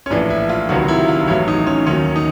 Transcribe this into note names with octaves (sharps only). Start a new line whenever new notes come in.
C#4
A#1 A2 E3 D4
E4
F4
C#2 C3 D#3 F#3 F#4
E4
F4
A1 A2 F#3 E4
D#4
C#4
D#2 D#3 F#3 C#4
D#4